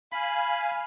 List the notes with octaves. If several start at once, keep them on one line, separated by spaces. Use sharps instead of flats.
F5 G#5 B5